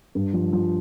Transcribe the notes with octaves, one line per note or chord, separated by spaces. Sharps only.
G2
F3
F3